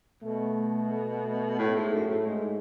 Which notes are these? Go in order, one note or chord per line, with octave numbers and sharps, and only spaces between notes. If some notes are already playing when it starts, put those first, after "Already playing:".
B2 A3
A3
A2 A3
G#2
F#2
A2
G#2 G#3